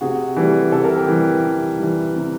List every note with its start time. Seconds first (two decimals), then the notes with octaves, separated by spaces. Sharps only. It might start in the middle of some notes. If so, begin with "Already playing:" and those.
0.01 C3 F#4 G#4
0.36 E3 G3 G4 A4
0.72 C3 A4
0.84 A#4
0.96 G4 A4
1.08 E3 G3
1.44 C3
1.79 E3 G3
2.16 C3